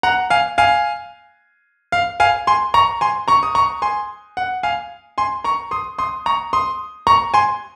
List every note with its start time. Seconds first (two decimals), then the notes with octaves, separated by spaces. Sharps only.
0.03 F#5 A#5
0.30 F5 G#5
0.58 F5 G#5
1.92 F5
2.20 F5 G#5
2.47 G#5 C6
2.74 A#5 C#6
3.01 G#5 C6
3.28 A#5 C#6
3.43 D#6
3.55 A#5 C#6
3.82 G#5 C6
4.37 F#5
4.63 F5 G#5
5.18 G#5 C6
5.44 A#5 C#6
5.71 C6 D#6
5.99 C6 D#6
6.26 A#5 C#6
6.53 C6 D#6
7.07 A#5 C#6
7.34 G#5 C6